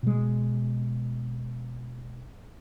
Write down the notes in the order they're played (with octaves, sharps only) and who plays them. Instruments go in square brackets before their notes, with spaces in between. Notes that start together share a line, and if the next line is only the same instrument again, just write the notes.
[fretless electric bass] B2 G#3